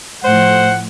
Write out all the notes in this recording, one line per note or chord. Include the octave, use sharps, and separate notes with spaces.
A2 F3 C5 F#5